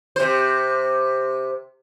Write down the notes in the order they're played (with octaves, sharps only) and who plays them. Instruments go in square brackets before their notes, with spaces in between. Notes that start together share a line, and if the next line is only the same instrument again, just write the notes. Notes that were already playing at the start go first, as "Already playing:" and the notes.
[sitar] C3 C5